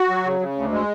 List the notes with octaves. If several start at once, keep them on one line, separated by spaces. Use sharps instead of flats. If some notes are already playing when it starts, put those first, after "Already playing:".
Already playing: F#4
F#3
C#3
C#3
D2
G#3